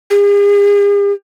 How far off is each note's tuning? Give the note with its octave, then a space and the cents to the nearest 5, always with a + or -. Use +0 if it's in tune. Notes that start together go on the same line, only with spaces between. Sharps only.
G#4 -45